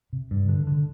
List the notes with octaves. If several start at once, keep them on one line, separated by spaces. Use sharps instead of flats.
C3
G2
D3
D3